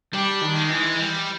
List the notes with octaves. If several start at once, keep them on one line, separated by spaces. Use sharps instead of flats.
G3 D4
D#3
G#3
E3
G3